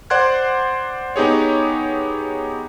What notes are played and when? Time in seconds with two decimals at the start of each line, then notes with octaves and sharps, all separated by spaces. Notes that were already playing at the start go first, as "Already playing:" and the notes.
0.10 C5 D5 F#5 C6 F#6 G#6
1.16 B3 D#4 G4 G#4 C#5